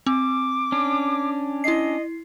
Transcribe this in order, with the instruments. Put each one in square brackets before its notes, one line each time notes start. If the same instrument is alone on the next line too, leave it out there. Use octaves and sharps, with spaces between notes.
[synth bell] C4 [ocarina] D6
[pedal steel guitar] C#4 D4
[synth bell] E4 C7 [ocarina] D#5